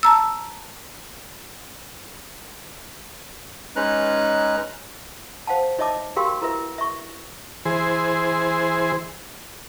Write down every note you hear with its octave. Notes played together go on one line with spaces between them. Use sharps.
A5 A#5 E6
G#3 C#4 D#4 B4 A#5 F#6
C5 F5 F#5 A5
D#4 C#5 D#5 E5 A5 D6
F#4 G4 A#4 F5 G5 C6
E4 A#4 B4 E5
E5 C#6
E3 G#4 C5